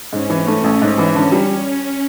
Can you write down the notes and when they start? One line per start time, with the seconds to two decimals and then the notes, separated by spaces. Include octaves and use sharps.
0.13 G#2 C#4
0.30 E3
0.47 A3
0.64 A1
0.82 G#2
0.98 E3
1.15 D3
1.32 G3